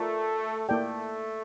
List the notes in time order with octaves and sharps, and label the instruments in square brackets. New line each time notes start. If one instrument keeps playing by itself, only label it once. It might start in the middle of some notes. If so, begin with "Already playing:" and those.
Already playing: [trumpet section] A3 [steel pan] F4 A#4 D5
[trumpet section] A3 [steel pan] A#3 E4 A4 D5 G5